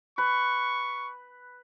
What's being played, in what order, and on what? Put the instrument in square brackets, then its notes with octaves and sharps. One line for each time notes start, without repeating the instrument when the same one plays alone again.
[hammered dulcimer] B4 [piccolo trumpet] C#6